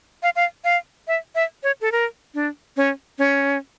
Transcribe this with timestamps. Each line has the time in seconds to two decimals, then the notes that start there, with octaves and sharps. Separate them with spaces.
0.23 F5
0.36 F5
0.64 F5
1.08 E5
1.35 E5
1.63 C#5
1.81 A4
1.92 A#4
2.34 D4
2.77 C#4
3.19 C#4